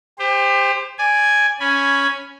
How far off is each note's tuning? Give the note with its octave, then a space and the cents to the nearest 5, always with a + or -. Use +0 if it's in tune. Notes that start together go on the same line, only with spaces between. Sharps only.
G4 +30 C5 +0
D5 +0 G#5 +0
C#4 +5 G#5 +0 B5 +0